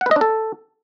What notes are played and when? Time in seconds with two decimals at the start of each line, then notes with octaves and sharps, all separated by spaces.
0.01 F#5
0.06 B4
0.11 D#5
0.16 D4
0.21 A4